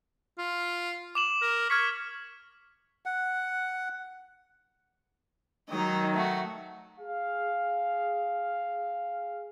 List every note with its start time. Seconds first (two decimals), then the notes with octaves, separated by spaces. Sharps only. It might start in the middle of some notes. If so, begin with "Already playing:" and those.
0.38 F4
1.15 D6 E7 F#7
1.42 A#4
1.70 C#6 F6 G#6 B6
3.06 F#5
5.69 D#3 F#3 D#4 D#5
6.15 A3 F#4
6.99 G#4 F5